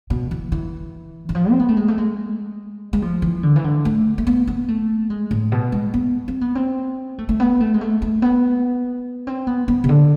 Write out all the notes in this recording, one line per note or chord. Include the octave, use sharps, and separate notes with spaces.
B2
E3
E3
E3
F3
C4
B3
A3
G#3
A3
G#3
G#3
F3
E3
D3
E3
D3
A3
A3
B3
B3
A3
G#3
A2
B2
G#3
B3
C4
B3
C4
A3
A3
B3
A3
G#3
A3
A3
B3
C4
B3
B3
C3
D3